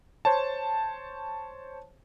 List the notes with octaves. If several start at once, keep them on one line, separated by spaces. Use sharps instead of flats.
C5 C#5 A5